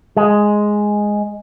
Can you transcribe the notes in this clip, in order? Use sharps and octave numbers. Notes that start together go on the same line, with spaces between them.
G#3